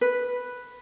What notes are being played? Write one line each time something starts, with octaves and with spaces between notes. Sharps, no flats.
B4